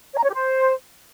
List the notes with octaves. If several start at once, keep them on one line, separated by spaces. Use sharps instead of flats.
C#5
A#5
C#5
G4
C5